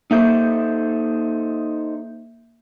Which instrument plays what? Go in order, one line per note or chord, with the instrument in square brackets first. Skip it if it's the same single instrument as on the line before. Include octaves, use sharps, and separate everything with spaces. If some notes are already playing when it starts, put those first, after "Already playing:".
[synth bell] A#3 E5 G6 [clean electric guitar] D#4 A4 C5